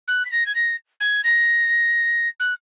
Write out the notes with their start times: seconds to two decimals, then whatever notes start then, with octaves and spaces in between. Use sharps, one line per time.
0.07 F#6
0.25 B6
0.32 A#6
0.46 G#6
0.55 A#6
1.00 G#6
1.24 A#6
2.39 F#6